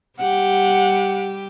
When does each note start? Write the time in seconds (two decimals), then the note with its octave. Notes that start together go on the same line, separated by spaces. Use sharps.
0.19 G3 G4 F#5